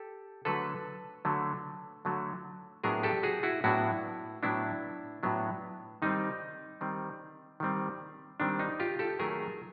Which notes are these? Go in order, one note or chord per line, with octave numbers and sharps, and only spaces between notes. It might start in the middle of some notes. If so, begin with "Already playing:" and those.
Already playing: G4 A4
D3 F#3 A3 A4 B4
D3 F#3 A3
D3 F#3 A3
A2 F#3 B3 D4 G#4 A#4
G4 A4
F#4 G#4
E4 F#4
A2 F#3 B3 D4 E4 F#4
A2 F#3 B3 D4 E4
A2 F#3 B3 D4
D#3 G3 C4 D#4
D#3 G3 C4
D#3 G3 C4
D#3 G3 C4 D4
D#4
F4 G4
G4 A4
D#3 F#3 A3 G#4 A#4